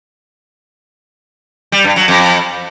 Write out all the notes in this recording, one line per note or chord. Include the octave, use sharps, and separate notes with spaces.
G3
G2
F#3
F2